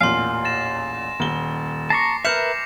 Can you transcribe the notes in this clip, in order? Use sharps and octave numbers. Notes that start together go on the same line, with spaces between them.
A1 E2 A#2 F5 G#5 C6
A6 A#6 E7
D#1 G7
A5 A#5 C#6 D6 A#6 C7
A#4 B4 E5 F6 G6 C#7 E7 F7